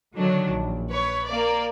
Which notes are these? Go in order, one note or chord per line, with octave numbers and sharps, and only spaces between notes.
D3 D#3 F#3 D4
A#1
B4 C#5
A#3 D5